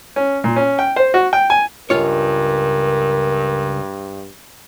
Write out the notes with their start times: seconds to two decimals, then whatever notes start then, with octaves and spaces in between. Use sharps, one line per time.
0.16 C#4
0.44 A#2
0.56 C#4
0.79 G5
0.96 C5
1.14 F#4
1.33 G5
1.50 G#5
1.90 C#2 G2 F4 A#4 C#5